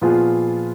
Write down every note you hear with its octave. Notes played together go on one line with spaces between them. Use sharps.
A#2 F3 B3 F4 G#4